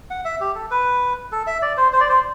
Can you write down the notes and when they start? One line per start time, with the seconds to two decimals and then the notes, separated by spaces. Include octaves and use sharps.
0.10 F#5
0.25 E5
0.41 G4
0.55 A4
0.71 B4
1.32 A4
1.47 E5
1.62 D5
1.77 C5
1.93 C5
2.01 D5
2.09 C5